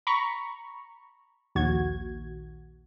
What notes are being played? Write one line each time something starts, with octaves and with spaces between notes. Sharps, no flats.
A#5 B5 C#6
A#1 D#2 F#4 G#6